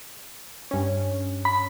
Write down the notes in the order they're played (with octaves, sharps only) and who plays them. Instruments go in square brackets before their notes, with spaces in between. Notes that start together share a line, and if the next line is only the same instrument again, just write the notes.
[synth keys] G2 C#4
[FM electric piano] B5